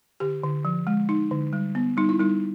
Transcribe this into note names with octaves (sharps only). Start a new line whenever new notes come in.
D3 G4
D3
F3
G#3
D#4
D3
G3
B3
G3 D#4
E4
G3 D#4